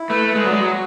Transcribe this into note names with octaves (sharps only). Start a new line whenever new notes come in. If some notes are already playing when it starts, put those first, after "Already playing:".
Already playing: E4
A3 B4
B4
G#3
F#3 D5
G#3
F#3 F#4